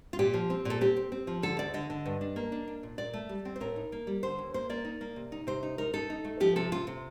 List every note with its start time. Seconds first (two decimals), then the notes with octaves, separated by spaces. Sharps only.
0.13 F4
0.19 A#2 G4
0.34 F3
0.50 C4
0.65 A#2 A4
0.81 C4 G4
0.96 C4
1.12 C4
1.27 F3
1.43 D3 A4
1.58 D2 D5
1.74 D3 D#5
1.90 D3
2.06 G2
2.21 D4
2.36 A#3
2.52 D4
2.68 D4
2.83 A#2
2.98 A#2 D5
3.13 A3
3.29 G3
3.45 C4
3.56 C5
3.60 A2 A#4
3.76 D#4
3.92 A#3
4.07 G3
4.23 D3 C5
4.38 D#2
4.54 A#3 C5
4.69 A#3 D5
4.85 D#4
5.01 A#3
5.16 C3
5.32 D#4
5.47 C3 C5
5.63 D#4
5.78 D#4 A#4
5.93 D#4 A4
6.10 D#4
6.25 A3
6.40 F3 G4
6.56 C3 A4
6.72 C3 F4
6.87 C3